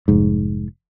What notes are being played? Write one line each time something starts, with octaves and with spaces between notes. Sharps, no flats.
F1 G#2